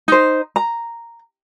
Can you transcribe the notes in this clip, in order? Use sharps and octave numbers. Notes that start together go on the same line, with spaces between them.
D#4 C5
A#5